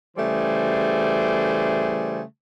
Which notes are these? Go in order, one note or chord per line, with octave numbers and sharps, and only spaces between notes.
C#3 E3 G3 A3 G#4 C5